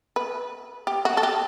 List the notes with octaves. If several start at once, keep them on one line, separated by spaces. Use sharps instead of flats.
B4
G4
F#4
A4
G4